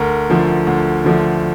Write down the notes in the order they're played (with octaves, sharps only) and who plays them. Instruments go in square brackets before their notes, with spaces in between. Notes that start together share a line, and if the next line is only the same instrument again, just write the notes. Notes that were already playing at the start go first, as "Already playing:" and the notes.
Already playing: [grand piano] D2 A#4
D3 F3 A3
D2
D3 F3 A3